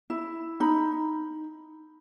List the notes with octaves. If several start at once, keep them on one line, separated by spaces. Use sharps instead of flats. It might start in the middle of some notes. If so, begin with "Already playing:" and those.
E4
D#4 B5